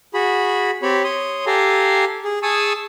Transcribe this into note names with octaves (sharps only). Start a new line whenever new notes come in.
F#4 G#4 B5
C4 G4 C#5 B5
C#5 C6 D#6
G4 A4 F5 G#5 A#5
G#4
G#4 G#5 A5 C#6 D#6 E6